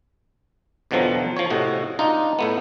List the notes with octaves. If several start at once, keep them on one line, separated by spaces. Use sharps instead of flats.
E2 B2 D3 F3 F#3 C4
F3 C#5
A2 C3 F#4 D#5
D4 D#4 F4
A2 A3 B3